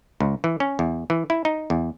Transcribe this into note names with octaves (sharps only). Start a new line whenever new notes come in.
C#2
E3
C#4
E2
E3
E4
D#4
E2